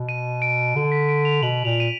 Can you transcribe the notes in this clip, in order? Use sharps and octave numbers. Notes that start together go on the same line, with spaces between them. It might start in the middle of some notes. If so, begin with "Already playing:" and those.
Already playing: B2
D#7
D7
D3
B6
D7
F7
B2 F#7
A#2 F7
D#7